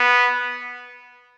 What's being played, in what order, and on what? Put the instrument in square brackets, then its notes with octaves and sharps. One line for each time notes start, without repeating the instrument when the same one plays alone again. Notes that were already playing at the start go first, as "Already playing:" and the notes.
Already playing: [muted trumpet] B3